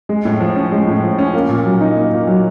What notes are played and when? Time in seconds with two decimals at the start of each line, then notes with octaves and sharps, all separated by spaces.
0.09 G#3
0.25 A2
0.40 F3
0.56 C#4
0.72 G#3
0.87 A2
1.03 F3
1.18 C#4
1.34 A#3
1.49 A#2
1.65 F#3
1.81 D#4
1.96 A#3
2.12 A#2
2.27 F#3